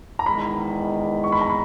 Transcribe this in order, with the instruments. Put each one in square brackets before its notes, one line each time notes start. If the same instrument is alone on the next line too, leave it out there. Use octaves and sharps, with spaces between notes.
[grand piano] A#5
[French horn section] E2 D#3 G#3 [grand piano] B5
[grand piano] C#6
B5
A#5
B5